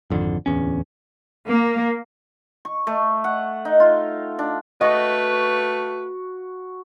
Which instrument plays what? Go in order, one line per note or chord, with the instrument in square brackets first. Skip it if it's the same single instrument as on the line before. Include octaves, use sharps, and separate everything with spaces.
[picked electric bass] G#1 F2 D3
D1 E2 C#4
[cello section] A#3
[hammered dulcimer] C#6
A3
F#5
D#4
F4
D4
[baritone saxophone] A3 [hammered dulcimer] F#4 [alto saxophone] B4 [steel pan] D#5